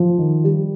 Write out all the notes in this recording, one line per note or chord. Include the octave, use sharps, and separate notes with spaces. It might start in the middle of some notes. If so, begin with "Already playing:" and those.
Already playing: F3
D#3
G3